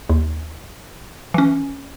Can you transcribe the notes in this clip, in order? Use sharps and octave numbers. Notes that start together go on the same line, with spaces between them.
D#2
E3 C#4